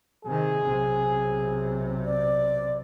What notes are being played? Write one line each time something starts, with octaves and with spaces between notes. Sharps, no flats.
C3 D#3 G#4
B1 C3
D5